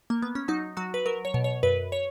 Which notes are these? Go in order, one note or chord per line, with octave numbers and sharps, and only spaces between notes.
A#3
B3
C#4
F#3 D#4
F#3 F#4
B4
F#3 A#4
C#5
B2
C#5
F#2 B4
C#5